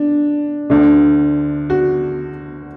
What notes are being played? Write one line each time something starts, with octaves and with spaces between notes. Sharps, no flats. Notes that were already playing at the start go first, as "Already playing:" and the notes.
Already playing: D4
D2 D3 D4
F#4